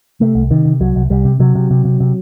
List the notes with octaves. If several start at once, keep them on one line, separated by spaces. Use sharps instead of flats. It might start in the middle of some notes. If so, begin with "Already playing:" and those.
C3 A3
C2
C3 D#3
C3
C2 F#3
C2
C2 G3
C3
C3 F#3
C3
C3
C3
C3